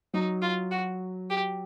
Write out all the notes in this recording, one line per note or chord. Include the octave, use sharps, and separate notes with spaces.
F#3 D#4
F4
F#4
G4